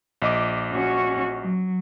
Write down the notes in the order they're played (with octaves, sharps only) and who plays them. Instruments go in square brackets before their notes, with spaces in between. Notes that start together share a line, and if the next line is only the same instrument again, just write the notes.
[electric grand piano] A#1 D#5 D6
[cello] C#4 F#4
F#3